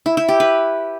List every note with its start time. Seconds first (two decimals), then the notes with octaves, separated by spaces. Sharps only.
0.06 E4
0.17 E4
0.29 G4
0.40 B4